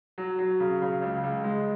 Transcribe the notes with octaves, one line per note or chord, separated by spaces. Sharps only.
F#3
F#3
C#3
C#3
C#2
C#2
G#3